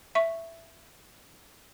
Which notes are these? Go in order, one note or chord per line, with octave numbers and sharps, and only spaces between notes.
E5 C#6